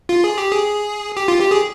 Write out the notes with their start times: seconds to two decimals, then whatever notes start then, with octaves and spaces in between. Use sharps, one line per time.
0.09 F4
0.24 G#4
0.38 G4
0.52 G#4
1.17 G4
1.28 F4
1.40 G4
1.51 G#4